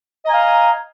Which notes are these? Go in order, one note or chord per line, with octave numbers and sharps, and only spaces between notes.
D#5 F5 G#5 A#5